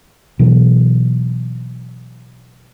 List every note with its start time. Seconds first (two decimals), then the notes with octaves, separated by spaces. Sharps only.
0.39 B2 E3 F#3